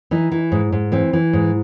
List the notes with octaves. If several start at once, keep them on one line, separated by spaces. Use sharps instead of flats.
E3 D#4
E3
G#2
G#2
E3 C4
E3
G#2